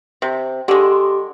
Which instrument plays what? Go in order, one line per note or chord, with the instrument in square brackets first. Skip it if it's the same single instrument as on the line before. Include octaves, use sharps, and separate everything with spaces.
[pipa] C3
[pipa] D3 G#3 [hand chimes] G4 D6